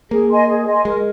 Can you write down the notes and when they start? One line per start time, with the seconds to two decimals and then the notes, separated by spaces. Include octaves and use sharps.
0.11 A#3 G#4
0.30 D#5 G#5 C6
0.49 G#4
0.66 D#5 G#5 C6
0.84 G#3 A#4